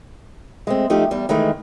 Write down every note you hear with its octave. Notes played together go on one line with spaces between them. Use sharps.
G#3 A3 C4
F3 A3 D#4 G4
E2 G3
D#3 E3 G#3 A3